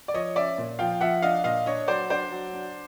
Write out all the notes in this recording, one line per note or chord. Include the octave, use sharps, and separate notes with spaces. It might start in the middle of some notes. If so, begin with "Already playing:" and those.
D5
F3 C#5 D#5
C#4 D5 E5
A#2
F3 F5 G5
F3 E5 F#5
D4 D#5 F5
A#2 D#5 F5
D4 C#5 D#5
F#3 C5 D5
D4 C5 D5
F#3
D4